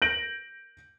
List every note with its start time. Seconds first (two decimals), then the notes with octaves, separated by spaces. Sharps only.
0.02 G6 A#6 D7 F#7